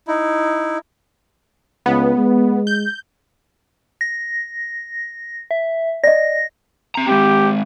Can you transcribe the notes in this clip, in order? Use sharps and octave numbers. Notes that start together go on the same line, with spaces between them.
D#4 E4
C#2 B3
G#3
G6
A#6
E5
D5 D#5 A#6
C4 A#5
G#3 C4 G4